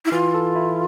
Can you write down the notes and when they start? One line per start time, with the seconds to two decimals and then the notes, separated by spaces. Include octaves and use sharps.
0.05 E4
0.12 E3 F4
0.34 A4
0.56 E4